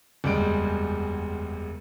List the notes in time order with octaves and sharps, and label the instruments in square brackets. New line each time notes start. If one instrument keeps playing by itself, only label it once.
[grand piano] F#1 E2 G3 G#3 D7